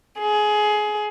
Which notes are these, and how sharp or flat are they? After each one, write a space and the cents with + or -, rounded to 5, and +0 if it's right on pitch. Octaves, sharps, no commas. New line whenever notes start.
G#4 +20